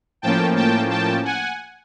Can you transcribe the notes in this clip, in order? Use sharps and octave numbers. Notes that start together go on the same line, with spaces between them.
A2 F3 A#3 C#4 G5 A5
G5 A5
G5 A5
F#5 G#5